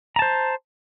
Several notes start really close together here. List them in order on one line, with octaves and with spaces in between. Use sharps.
A#5 A5 C5